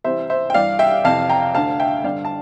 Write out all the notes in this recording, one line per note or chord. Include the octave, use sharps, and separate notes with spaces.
C2 C3 E3 C5 E5
C5 E5
G5
G2 E3 D5 F5
E5 G5
F2 C3 E3 F5 A5
G5 A#5
D2 D3 F5 A5
E5 G5
G2 D3 D5 F5
A5